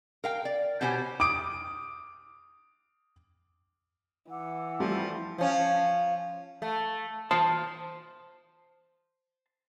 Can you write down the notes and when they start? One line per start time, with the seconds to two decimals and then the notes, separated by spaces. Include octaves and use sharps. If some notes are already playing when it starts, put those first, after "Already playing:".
0.24 A#4 F5 G5
0.45 D5
0.81 B2 B3 G4 C5 C#5 G#5
1.20 D6 D#6 D7
4.31 E3 F#5 D6 E6
4.80 F3 G3 A3
5.38 F3 C#4
6.62 A3
7.31 C5 A5